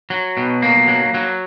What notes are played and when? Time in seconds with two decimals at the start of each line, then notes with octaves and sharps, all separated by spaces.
0.10 F#3
0.37 B2
0.62 A#3
0.88 F#3
1.14 F#3